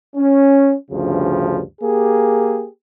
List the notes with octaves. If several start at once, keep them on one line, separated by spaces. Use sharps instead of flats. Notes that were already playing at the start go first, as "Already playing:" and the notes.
C#4
D2 G2 C#3 F3
A#3 G4 G#4